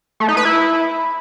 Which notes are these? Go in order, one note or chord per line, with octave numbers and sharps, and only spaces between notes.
A3
D#4
B4
E4